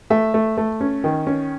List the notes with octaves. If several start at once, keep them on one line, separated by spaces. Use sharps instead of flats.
A3 E5
A3
A3
C#4
D#3
C#4